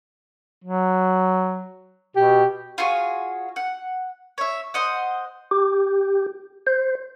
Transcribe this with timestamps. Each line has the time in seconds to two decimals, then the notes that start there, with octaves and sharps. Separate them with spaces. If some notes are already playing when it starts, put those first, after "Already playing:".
0.64 F#3
2.16 B2 G4
2.78 F4 F#4 G#4 C#5
3.56 F#5
4.38 C#5 E5
4.74 C5 D#5 F#5
5.51 G4
6.67 C5